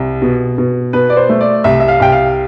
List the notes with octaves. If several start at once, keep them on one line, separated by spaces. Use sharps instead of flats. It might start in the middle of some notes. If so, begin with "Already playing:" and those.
Already playing: C2
B2
B2
B2 B4
D5
C5
A3
D5
C2 E5
E5
F5
C2 G5
F5